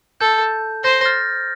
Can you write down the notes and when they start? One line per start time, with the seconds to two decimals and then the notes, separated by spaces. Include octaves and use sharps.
0.21 A4 G6
0.84 C5 G6 A#6
1.01 A#6
1.06 F6 A6